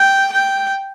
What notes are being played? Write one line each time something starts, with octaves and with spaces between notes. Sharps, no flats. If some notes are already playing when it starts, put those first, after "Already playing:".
Already playing: G5
G5